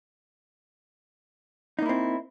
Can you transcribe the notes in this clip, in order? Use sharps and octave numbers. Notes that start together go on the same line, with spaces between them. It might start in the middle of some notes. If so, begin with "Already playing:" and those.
A#3 C4 D#4 E4